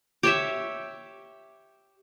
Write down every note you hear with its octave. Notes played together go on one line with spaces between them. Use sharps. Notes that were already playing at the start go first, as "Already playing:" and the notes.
G4 C#5 E5